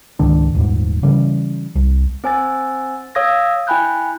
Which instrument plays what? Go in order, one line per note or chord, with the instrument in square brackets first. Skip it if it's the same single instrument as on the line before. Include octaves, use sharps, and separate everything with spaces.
[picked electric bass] C#2 G#2 D#3 D4
D#1 G#2
C#3 E3 G3
C2
[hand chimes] C4 C5 G#5 E6 A6
C#5 F5 D#6 E6 G#6 A#6
E4 G5 G#5 B5 F#6 G6